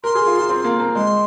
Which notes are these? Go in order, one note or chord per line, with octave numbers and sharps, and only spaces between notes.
A#4 C6
G#4
F4
F4
C4
A#3
A#3
G#3 C6